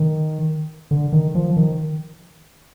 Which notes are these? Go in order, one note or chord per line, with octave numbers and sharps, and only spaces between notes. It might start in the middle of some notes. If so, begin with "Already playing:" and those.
Already playing: D#3
D3
D#3
F3
D#3